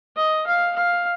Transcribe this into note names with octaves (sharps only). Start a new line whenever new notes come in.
D#5
F5
F5